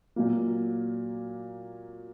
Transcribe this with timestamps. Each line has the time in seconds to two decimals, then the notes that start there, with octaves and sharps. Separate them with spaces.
0.16 A#2 F#3 A#3